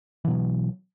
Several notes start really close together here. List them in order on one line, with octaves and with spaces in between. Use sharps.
E3 B2 F#3